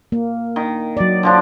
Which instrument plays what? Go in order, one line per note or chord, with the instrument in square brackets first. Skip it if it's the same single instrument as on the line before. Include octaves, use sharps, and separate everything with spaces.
[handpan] A#3
[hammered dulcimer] D#3
[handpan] F#3 D5
[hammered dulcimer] D3 F3 D4